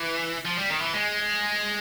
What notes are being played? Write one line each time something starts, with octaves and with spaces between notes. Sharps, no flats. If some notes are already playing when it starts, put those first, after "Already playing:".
Already playing: E3
F3
G3
D#3
E3
G#3